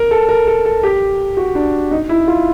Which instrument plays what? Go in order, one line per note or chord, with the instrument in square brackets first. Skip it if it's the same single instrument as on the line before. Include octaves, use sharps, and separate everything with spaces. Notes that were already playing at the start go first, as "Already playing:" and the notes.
Already playing: [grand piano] A#4
A4
A#4
A4
A4
G4
F#4
D4
D#4
E4
F4